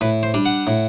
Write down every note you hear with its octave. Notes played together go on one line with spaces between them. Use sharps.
A2 B4
C5
G3 D4
F#5
A2